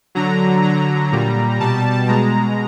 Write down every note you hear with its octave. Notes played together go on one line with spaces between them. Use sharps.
D3 F#3 A#5
D3 F#3 A#5
A#2 G3 A#5
B2 G3 A5
B2 G#3 A#5